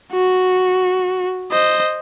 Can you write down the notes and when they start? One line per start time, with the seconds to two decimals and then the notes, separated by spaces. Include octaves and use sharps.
0.13 F#4
1.51 C5 D#5